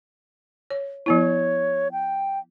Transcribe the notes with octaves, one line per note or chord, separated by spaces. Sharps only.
C#5
F3 B3 E4 C#5
G5